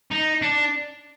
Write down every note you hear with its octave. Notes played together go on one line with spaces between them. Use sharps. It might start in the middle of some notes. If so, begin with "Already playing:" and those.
D#4
D4